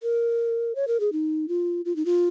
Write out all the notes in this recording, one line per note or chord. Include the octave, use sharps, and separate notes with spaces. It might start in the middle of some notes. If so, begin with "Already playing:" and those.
A#4
C#5
A#4
G#4
D#4
F4
F4
D#4
F4